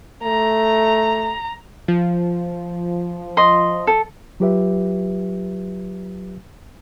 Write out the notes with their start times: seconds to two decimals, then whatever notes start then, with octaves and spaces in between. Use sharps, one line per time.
0.23 A3 A#5
1.88 F3
3.37 D#5 C6
3.87 A4
4.40 F#3 F4 G4 B4 E5